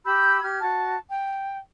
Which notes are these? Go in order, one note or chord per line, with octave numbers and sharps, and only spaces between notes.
G4 B5 E6 G6
G4 F6 G#6
F#4 A5
G5